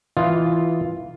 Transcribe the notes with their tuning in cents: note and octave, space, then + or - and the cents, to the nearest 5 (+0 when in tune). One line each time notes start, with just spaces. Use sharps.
E3 +0 F4 +0 D#5 +0